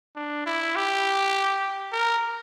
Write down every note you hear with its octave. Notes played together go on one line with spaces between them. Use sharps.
D4
E4
G4
A#4